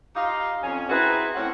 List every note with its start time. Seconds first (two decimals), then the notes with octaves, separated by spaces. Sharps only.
0.16 D#4 F4 G4 F5
0.63 F2 C#4
0.90 C4 D#4 E4 F#4 G#4 B4
1.35 A2 C4 C#4 F#5